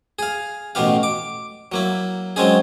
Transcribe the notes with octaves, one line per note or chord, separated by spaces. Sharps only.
G#4 F5
A1 B2 B3 G4 F5
D6
F#3 A#3 E4
F#3 G#3 C4 C#4 D#4 G#4